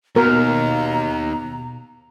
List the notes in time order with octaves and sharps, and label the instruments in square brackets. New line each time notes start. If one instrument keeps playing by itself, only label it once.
[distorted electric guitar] D#2 [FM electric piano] B2 [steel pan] A#4 [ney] A#5